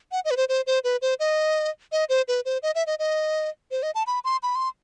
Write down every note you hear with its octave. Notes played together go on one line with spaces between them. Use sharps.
F#5
D#5
B4
C5
C5
C5
B4
C5
D#5
D#5
C5
B4
C5
D#5
E5
D#5
D#5
C5
D#5
A5
B5
C6
B5
C6